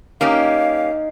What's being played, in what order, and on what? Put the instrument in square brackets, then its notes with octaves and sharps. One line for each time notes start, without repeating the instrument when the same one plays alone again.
[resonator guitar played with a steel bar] A#3 C#4 G4 [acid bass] D#4 [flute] F5